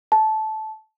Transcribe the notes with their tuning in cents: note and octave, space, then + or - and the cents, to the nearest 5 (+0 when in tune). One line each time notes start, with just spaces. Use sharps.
A5 -15